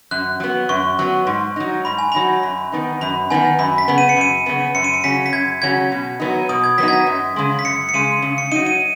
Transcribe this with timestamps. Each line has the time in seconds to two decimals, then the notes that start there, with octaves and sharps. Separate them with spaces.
0.11 F#2 F#6
0.40 F#3 B3
0.69 F#2 C#6
0.99 F#3 B3
1.27 G#2
1.56 F#3 D#4
1.85 G#2 B5
1.98 G#5
2.12 F#3 D#4 B5
2.43 F#2
2.72 D#3 B3 D#4
3.01 F#2 B5
3.30 D#3 B3 D#4 G#5
3.59 F#2 B5
3.78 B6
3.88 C#3 B3
3.98 D#7
4.09 C#7
4.17 F#2 D#7
4.46 C#3 B3
4.75 F#2 C#7
4.84 D#7
4.94 C#7
5.04 C#3 F#3 C#4 B6
5.26 B6
5.33 F#2 G#6
5.62 C#3 F#3 C#4 G#6
5.92 B2
6.20 F#3 B3 D#4
6.49 B2 D#6
6.64 G#6
6.78 F#3 B3 D#4 B6
6.88 G#6
6.93 B6
7.07 F#2
7.36 C#3 G#3
7.59 B6
7.65 F#2 C#7
7.89 C#7
7.94 C#3 G#3 D#7
8.22 C#3
8.38 C#7
8.52 F#3 D#4 D#7
8.66 D#7